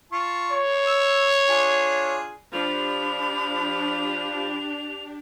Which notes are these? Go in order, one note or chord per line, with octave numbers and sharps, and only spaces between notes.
F4 A5 C#6
C#5
E6
D4 F4 G#4
F3 D4 G4 B5 F7